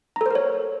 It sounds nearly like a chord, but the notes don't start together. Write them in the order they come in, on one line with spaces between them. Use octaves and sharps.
A#5 A4 C5 A#4 C#5